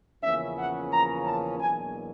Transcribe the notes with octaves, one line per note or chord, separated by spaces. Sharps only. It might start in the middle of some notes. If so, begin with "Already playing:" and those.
E2 C#3 F3 A#3 C#4 E5
F#5
A#5
A5
E2 B2 F#3 A#3 D4 G#5